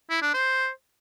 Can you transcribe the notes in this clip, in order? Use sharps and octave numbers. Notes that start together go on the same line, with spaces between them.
E4
D4
C5